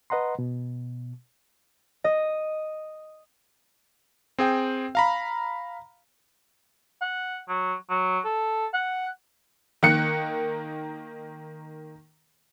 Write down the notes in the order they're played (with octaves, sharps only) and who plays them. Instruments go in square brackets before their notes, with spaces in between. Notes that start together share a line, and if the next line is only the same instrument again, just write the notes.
[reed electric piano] B4 D#5 F#5 A#5 C6
B2
[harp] D#5
[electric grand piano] C4 G#4 G5
F5 A#5 B5
[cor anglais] F#5
F#3
F#3
A4
F#5
[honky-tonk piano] D#3 A#3 F#6 C#7